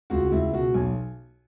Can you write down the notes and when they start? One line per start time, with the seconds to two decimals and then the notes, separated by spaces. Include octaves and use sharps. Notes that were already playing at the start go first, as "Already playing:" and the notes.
0.10 C#2 F#4
0.32 C#2 E4
0.53 B2 F#4
0.74 B1 G#5